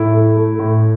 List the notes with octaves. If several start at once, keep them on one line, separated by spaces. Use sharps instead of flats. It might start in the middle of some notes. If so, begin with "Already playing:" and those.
Already playing: A2 E4
A3
A3
A2